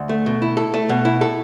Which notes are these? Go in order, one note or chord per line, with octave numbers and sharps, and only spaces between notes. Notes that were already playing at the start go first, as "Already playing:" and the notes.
Already playing: D2
A3
B2
E4
A4
A3
B2
E4
A4